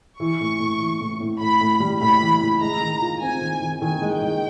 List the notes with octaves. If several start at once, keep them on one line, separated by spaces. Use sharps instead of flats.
E3 C#6
A2
A2
E3
A2
A2
A2 B5
A2
G3
A2 B5
E3
A2
G#3 A#5
D#3
F4
C4 G#5
D#3
D#3
D#3 G#5
G#3
G5
G#3